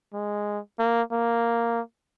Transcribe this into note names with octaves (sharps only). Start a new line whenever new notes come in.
G#3
A#3
A#3